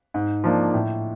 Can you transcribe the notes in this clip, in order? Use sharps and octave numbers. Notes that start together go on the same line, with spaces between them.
G#2
F3 A#3 D4
A2